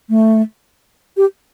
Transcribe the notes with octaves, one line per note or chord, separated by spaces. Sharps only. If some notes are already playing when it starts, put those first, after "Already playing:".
A3
G4